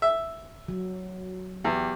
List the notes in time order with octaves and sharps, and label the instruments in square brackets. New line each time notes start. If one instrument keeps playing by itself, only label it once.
[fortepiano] E5
[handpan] F#3
[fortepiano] E2 [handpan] G4